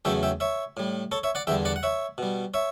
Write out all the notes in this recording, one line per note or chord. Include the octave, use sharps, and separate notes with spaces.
E2 C#3 F#3 A3 E5 G5
E5 G5
C#5 E5
A2 G3
A4 C#5
C#5 E5
D5 F#5
E2 D3 G3 E5 G5
D5 F#5
F#5
C#5 E5
B2 G3
C#5 E5